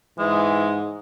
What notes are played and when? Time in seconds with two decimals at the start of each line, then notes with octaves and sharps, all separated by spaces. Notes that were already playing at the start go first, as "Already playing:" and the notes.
0.19 G#2 E3 G#3